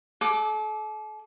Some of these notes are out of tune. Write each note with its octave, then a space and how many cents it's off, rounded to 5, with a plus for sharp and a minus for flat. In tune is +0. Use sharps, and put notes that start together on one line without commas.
A4 -40 D6 +0